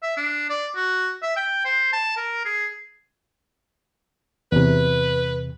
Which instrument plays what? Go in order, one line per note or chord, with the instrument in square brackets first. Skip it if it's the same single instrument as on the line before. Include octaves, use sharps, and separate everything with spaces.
[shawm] E5
D4
D5
F#4
E5
G5
C5
A5
A#4
G#4
[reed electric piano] E2 C3 [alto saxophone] B4